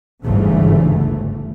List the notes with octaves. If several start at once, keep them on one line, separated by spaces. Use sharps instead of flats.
G1 D2 G#2 C#3 E3 A3